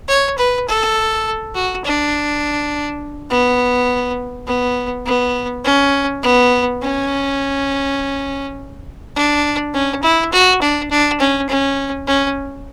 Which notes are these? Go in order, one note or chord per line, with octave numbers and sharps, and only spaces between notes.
C#5
B4
A4
F#4
D4
B3
B3
B3
C#4
B3
C#4
D4
C#4
E4
F#4
D4
D4
C#4
C#4
C#4